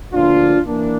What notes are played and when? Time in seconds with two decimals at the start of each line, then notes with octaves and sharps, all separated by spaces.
0.14 D2 D3 F3 A#3 D4 F4
0.66 E3 A#3 D4